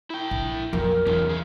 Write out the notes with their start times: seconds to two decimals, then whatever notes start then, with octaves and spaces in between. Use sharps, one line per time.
0.10 E4 G5
0.31 A#1
0.73 F2 A#2 F#3 A#4
1.07 E2 D#3 F3 C#4
1.26 C3 G#4